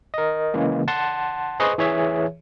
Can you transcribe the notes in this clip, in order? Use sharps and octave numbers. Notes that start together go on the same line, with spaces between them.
A#4 D#5
C#3 E3 G#3 A#3
F#5 A5 C6
G#4 B4 C5 D#5 C6 C#6
E3 G#4 C#5 E5